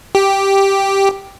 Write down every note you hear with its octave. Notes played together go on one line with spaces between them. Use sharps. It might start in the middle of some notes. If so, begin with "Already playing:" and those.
G4